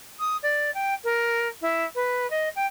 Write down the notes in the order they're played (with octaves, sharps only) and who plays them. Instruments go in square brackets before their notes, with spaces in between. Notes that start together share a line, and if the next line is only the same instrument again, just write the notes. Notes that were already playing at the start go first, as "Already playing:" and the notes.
[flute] D#6
D5
G5
A#4
E4
B4
D#5
G5